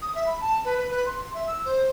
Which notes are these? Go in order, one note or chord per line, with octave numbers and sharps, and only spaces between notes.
D#6
E5
B5
A5
B4
B4
B4
C6
E5
E6
C5